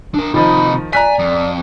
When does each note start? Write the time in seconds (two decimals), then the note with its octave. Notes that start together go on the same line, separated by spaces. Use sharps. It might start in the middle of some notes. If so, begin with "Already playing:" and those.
0.14 D4 A#4
0.34 C3 D#3 F3 D#4 D#5 B5
0.93 D5 G#5 A#5 F#6 B6
1.19 F2